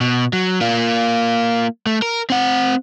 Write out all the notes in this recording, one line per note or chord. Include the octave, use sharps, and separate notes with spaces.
B2
F#3
A#3 F4
A3
A#4
C4 F#5